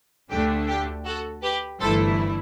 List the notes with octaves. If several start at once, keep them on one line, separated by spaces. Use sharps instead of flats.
D2 D3 A3 D4 G4
G4
F#4 A4
G4 B4
G1 G2 E3 A3 E4 A4 C5